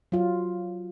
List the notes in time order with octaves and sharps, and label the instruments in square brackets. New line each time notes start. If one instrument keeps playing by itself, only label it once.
[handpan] F#3 F4